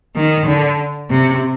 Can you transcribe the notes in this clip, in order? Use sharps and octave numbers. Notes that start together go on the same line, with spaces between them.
D#3
D3
C3